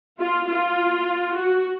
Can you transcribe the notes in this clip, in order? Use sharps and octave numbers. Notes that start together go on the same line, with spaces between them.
F4
F4
F#4